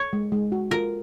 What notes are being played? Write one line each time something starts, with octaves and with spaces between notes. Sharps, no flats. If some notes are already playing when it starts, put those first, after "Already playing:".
Already playing: C#5
G#3
G#3
F#4
F4 A#4